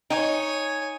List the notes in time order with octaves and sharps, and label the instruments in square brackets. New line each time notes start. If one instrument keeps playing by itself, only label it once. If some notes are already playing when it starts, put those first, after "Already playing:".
[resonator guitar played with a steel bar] D#4 [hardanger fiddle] C#5 G#5